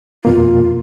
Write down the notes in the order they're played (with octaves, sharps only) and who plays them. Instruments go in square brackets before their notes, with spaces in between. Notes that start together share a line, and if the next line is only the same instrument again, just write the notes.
[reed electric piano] F2 B2 A#3 [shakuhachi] F4